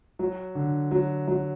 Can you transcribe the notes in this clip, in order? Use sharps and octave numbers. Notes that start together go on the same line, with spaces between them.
F#3
D3
F#3
F#3